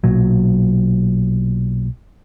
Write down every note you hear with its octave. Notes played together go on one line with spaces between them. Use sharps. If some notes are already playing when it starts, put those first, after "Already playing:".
B1 A#2 F#3